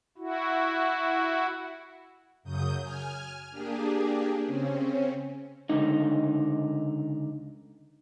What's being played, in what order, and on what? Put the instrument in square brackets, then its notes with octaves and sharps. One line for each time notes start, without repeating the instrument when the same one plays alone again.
[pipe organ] E4 F#4
[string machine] F#2 C#3 F#3 D#6 G6
G#5 F6
A#3 D4 G4 G#4
C#3 C4 C#4
[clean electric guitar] C#2 D3 D#4